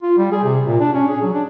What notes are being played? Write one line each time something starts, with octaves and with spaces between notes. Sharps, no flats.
F4
G3
G#4
C3
A#2
D4
C#4
G#4
F#3
D4